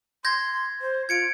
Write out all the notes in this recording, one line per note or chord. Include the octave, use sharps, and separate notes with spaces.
C6 G6 G#6 A#6
C5
F4 G#6 C#7 D7